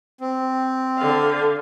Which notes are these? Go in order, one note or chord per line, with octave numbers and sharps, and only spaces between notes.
C4
D3 F5